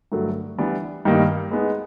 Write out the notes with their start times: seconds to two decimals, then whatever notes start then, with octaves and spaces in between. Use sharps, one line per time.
0.12 G2 D3 F#3 A3
0.58 E3 G3 B3 D4
1.05 G2 D#3 G3 A#3 D#4
1.52 G#3 B3 D#4